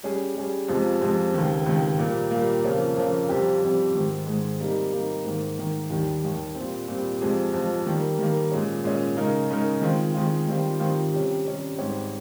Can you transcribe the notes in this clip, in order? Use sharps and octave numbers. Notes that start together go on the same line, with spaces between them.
G3 C#4 G#4
G3 C#4 G#4
F2 C3 F3 G#3
F2 C3 F3 G#3
C#2 C3 D#3
C#2 C3 D#3
A#2 G3 A#3
A#2 G3 A#3
F2 C#3 F3 A#3 C#4
F2 C#3 F3 A#3 C#4
F2 C3 G3 C4 G4
F2 C3 G3 C4 G4
G#2 D#3 G#3
G#2 D#3 G#3
C3 G3 A#3 D#4
C3 G3 A#3 D#4
G#2 D#3 A#3
G#2 D#3 A#3
D#2 D#3 G3
D#2 D#3 G3
A#2 G3 C4
A#2 G3 C4
F2 C3 F3 G#3
F2 C3 F3 G#3
D#3 G3 A#3
D#3 G3 A#3
A#2 G#3 C#4
A#2 G#3 C#4
C#3 G#3 D#4 A#4
C#3 G#3 D#4 A#4
D#3 G#3 C4 F4
D#3 G#3 C4 F4
D#3 G3 C4 F4
D#3 G3 C4 F4
C3 G3 C#4
C3 G3 C#4
G#2 G3 C4 G4 C#5